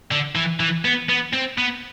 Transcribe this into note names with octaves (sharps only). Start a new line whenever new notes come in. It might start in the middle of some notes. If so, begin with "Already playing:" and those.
D3
E3
E3
B3
B3
C4
B3